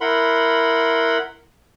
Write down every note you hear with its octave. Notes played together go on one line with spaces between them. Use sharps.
E4 A#4 F#5 B5 C6